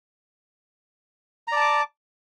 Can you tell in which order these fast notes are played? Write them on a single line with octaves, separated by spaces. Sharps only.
A#5 D5 A5 D6